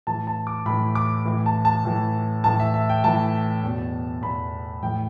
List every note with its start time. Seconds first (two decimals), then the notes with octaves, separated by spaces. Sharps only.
0.07 A2 E3 A5
0.27 A5
0.47 D6
0.66 A2 E3 B5
0.95 D6
1.26 A2 E3
1.46 A5
1.65 A5
1.85 A2 E3
2.44 A2 E3 A5
2.60 E5
2.74 E5
2.89 G5
3.04 A2 E3 A5
3.63 E2 B2
4.22 E2 B2 B5
4.83 A2 E3 G5